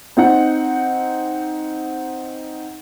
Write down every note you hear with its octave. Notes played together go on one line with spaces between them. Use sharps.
C4 D#4 F#5